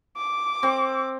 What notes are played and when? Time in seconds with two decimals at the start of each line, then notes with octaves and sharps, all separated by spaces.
0.17 D6
0.63 C4